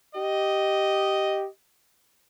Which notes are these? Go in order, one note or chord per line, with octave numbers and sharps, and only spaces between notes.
G4 D#5